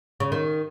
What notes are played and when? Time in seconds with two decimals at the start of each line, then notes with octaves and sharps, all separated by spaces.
0.20 C#3
0.32 D#3